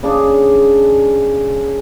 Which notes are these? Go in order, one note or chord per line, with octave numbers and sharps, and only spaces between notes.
C#3 D4 G#4